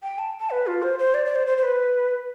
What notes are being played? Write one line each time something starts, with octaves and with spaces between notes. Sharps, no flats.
G5
A5
A5
B4
F4
C5
C5
D5
D5
C5
C5
C5
B4